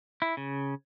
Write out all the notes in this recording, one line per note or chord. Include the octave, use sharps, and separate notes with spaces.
E4
C#3